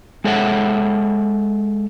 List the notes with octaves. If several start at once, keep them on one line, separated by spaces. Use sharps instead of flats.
G#3 A4 C#5 E5 F#5